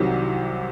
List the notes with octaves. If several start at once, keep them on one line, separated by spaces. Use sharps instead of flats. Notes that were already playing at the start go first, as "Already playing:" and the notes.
Already playing: C2 C3 D#3 F#3